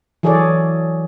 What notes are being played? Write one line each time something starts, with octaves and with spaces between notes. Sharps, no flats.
E3 F#3 G#4 A4 C#5 D5